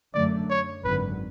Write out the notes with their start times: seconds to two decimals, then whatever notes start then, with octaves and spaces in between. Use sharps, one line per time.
0.14 F#2 D3 F#3 A3 D5
0.50 C#5
0.84 G#1 F#2 D3 B4